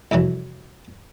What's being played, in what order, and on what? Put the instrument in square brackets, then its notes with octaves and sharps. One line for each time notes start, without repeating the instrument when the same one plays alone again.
[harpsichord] C2 F2 E3 F#3